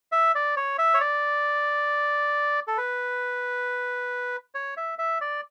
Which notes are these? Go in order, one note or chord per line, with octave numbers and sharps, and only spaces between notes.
E5
D5
C#5
E5
C#5
D5
A4
B4
C#5
E5
E5
D5